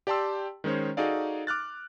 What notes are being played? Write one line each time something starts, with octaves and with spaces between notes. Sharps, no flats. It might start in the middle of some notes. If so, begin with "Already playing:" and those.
G4 D5 G5 A5 C6 E6
D#3 G#3 C#4 C5 C#5
D#4 F#4 G#4 A4 D5 F5
D6 F6 F#6 A6